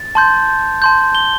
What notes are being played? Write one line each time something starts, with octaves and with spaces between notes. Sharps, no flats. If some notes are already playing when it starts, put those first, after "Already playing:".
Already playing: A6
A5 C6 G6
A5 C6 G6
G7